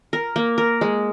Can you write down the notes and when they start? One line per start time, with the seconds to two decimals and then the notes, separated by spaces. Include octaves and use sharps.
0.13 A#4
0.36 A#3
0.58 A#4
0.81 G#3